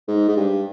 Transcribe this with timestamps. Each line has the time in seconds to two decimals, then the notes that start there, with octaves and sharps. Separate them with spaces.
0.08 G#2
0.28 G#2
0.37 G2